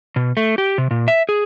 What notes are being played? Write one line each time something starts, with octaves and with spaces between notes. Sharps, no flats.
B2
A3
G4
C3
A#2
E5
G#4